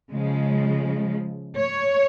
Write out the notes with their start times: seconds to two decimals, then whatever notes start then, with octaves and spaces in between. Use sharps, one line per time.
0.10 C#3 F3 G#3
1.56 C#5